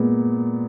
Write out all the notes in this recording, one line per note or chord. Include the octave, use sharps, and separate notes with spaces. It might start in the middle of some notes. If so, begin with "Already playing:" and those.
Already playing: A#2 G#3 B3